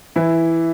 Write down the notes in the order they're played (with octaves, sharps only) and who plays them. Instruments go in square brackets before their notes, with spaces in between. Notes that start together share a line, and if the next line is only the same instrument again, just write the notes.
[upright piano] E3 E4